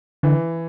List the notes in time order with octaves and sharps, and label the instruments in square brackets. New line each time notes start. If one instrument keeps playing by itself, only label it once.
[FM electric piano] D3 [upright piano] E3